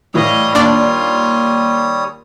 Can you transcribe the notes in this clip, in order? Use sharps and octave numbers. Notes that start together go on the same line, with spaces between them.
A2 E3 G3 C#5 D#5 F5 D#6
D#2 D4 F4 D5